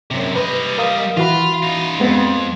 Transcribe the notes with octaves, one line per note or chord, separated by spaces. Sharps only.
F#2 C3
G3 B4 D#5
A#4 F5 D#6
E3 F4 F#4 B5
D#4 F4
F2 G#3 B3 C4